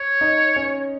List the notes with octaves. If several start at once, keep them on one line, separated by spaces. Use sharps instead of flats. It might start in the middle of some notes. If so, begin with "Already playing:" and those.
Already playing: C#5
D#4
C#4